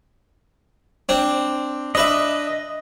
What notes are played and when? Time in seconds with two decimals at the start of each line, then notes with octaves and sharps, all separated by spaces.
1.09 C4 D4
1.95 D4 B4 D#5 E5